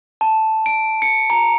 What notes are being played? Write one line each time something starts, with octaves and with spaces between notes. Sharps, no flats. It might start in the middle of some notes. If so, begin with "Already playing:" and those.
A5
D7
C#7
A#5